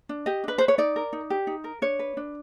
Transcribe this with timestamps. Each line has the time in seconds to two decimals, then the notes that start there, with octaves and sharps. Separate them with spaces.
0.09 D4
0.26 G4 D#5
0.44 D4 B4
0.58 B4 C5
0.68 C#5
0.78 D#4 D5
0.96 A#4
1.13 D#4
1.30 G4
1.47 D#4
1.64 A#4
1.82 D4 C#5
1.99 B4
2.17 D4